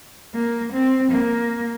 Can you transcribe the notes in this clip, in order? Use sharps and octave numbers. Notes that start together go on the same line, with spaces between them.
A#3
C4
A#3